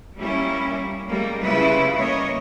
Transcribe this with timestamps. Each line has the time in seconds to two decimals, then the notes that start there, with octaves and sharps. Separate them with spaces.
0.17 G3 A#3 C#4 E4
1.08 G3 G#3 A#3
1.41 C#3 G3 E4 F4 B4
1.98 A#3 C#5 D#5